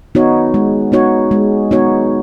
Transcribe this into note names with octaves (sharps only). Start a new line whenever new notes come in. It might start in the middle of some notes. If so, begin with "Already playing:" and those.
B3 D#4 F#4 C#5
G#3
B3 D#4 F#4 C#5
G#3
B3 D#4 F#4 C#5